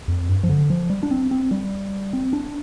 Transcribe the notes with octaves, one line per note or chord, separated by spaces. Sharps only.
F2
G2
F3
D3
F3
G3
D4
C4
C4
G3
C4
D4